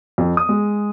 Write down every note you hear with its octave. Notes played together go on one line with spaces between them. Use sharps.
F2
D#6
G#3